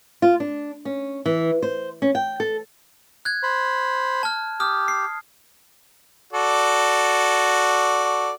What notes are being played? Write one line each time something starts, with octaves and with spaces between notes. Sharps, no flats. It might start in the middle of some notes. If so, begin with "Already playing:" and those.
F4
D4
C#4
E3
C5
C#4
G5
A4
F#6 G#6
C5 B5
A5 F6
G4 D#6 F6
C7
F#4 A4 D5